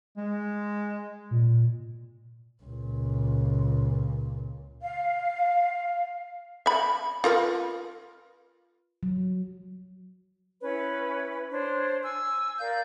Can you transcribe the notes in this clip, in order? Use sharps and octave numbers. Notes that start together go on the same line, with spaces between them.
G#3
A#2
C#2 A#2
F5
E5 B5
F4 A#4 B4
F#3
C#4 E4 B4 C#5
D4 C5 C#5
G#5 E6
A#4 D5 F5 G6